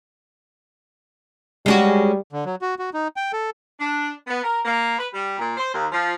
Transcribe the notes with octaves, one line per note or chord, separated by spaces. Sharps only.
G3 G#3 C#4 F#4
D3
F#3
F#4
F#4
D#4
G5
A4
D4
B3
A#4
A#3
B4
G3
A#2
C5
D#2
F3